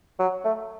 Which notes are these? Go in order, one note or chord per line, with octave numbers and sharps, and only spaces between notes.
F#3
A3